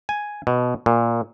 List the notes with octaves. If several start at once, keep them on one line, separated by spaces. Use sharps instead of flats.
G#5
B2
A#2